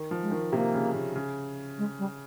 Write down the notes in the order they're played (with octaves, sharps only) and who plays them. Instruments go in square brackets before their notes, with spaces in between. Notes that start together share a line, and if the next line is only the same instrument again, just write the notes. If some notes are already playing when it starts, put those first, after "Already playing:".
Already playing: [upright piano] D#3
F3
[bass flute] G#3
[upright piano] D#3
[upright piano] C3 [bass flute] A#3
[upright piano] C#3
C#3
C#3
[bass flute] G#3
G3